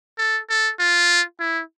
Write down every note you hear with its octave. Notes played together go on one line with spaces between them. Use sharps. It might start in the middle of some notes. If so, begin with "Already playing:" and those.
A4
A4
F4
E4